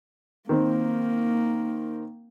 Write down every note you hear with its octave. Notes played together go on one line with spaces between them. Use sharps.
D#3 A#3 C4